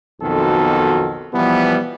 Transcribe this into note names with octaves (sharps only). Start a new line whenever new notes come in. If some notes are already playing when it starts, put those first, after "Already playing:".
B1 F2 B2 D#3 F#4 A4
B2 E3 F3 G3 B3